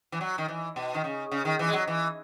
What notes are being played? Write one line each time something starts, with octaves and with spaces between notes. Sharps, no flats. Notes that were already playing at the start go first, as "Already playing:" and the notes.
E3
F#3
D#3
E3
B2
D#3
C#3
C#3
D#3
E3
G#3
F#3
E3